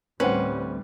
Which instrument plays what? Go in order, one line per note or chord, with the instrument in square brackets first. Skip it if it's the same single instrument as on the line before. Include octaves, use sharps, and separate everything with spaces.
[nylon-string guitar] D2 C4 [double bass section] A2 G3 [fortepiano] C#4 F#5 [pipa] B4